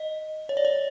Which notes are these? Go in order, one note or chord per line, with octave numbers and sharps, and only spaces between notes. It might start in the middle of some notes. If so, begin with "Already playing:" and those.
Already playing: D#5
C#5
D5
C#5